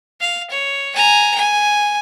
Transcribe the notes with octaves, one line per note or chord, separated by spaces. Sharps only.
F5
C#5
G#5 A#5
G#5